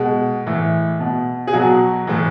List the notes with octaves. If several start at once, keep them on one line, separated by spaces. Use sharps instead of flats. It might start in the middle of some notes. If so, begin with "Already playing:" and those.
Already playing: B2 G#3
A2 E3
B2
G#4
B2 F#3 F#4
A2 E3